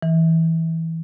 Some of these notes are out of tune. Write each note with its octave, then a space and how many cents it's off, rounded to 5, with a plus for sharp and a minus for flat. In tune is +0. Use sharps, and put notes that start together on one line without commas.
E3 -15